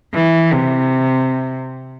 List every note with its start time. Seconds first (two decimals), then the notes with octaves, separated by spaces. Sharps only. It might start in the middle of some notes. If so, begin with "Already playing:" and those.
0.15 E3
0.53 C3